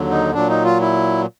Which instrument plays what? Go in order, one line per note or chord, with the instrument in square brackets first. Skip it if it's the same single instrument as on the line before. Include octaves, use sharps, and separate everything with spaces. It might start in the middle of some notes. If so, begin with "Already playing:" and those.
Already playing: [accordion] D#2 D3 F#3
D#4
A#2 F#3 D4
D#4
F4
E4